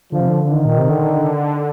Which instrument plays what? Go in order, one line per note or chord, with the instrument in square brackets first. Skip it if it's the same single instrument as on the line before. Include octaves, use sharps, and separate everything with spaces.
[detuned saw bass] D3 [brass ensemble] F3
[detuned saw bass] C3
D3
[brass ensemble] D#3
[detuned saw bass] A#2
C3
D3